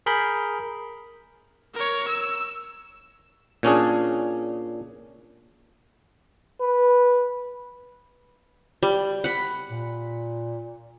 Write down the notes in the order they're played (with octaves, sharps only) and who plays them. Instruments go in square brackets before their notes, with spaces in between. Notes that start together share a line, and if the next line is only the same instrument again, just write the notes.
[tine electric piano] G#4 A#4 B5 G6
[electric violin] A#4 C#5
E6
[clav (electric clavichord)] A#2 C#4 D4 G#4
[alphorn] B4
[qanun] G3
F#5 B5
[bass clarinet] A#2